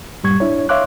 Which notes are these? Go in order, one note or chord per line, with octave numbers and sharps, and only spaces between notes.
G2 A#2 G3 C#6 G#6
D4 E4 C#5
C#5 E5 F5 C6 D6 F#6